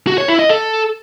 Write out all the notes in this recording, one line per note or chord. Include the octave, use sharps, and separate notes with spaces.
F#4
C#5
E4
D#5
A4